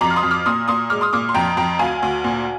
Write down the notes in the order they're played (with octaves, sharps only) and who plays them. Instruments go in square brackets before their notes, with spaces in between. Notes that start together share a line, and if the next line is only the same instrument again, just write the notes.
[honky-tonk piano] F2 A#5 D6
F6
C6 D#6
F2
D6 F6
A#2 C6 D#6
A#2 C6 D#6
G#3 D6 F6
C6 D#6
A#2 D6 F6
C6
F2 G5 A#5
F2 G5 A#5
D2 F5 G#5
D2
A#2